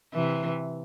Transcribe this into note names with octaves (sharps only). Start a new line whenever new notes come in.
C3 E3